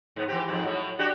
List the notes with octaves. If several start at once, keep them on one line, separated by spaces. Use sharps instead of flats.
G#2 B3
E3 C4 G4
F2 G#2 C4
A2 F#3
D4 F#4 G4